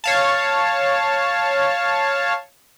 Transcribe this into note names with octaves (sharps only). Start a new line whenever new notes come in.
C#5 F5 A5